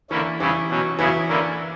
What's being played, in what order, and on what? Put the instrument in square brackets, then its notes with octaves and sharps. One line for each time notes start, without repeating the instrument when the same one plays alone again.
[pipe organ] D3 A#3 C#4 E4 [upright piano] E3
[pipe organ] C#3 G3 C#4 E4 [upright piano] E3
[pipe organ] B2 F#3 C#4
[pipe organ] C#3 F#3 B3 E4 [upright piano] E3
[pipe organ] D3 A#3 C#4 E4